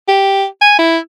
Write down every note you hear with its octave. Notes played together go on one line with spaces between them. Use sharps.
G4
G#5
E4